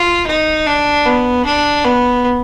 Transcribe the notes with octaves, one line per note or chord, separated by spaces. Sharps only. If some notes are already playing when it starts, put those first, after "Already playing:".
Already playing: F4
D#4
D4
B3
D4
B3